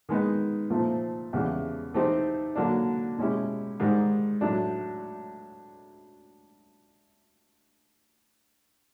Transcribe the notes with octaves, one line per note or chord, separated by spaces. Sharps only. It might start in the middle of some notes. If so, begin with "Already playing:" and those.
D#3 G#3 B3 D#4
A#2 F3 A3 C4 F4
E2 C#3 E3 G3
E3 A3 C4 D#4 G4
D3 F#3 A#3 D4
B2 G#3 C#4 E4 G4
G#2 D#3 G3
A2 F#3 A3 D4